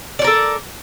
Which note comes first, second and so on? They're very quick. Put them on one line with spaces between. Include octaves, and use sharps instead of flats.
D5 C#5 A#4 A4